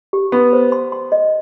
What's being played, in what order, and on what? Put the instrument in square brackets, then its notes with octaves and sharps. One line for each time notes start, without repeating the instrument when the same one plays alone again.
[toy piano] G4
[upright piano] B3 [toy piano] C6
[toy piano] C5
C6
C6
D#5